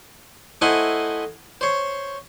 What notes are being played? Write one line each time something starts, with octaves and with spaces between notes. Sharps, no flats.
A3 E4 C5 D#5 F#5 G#5
C5 C#5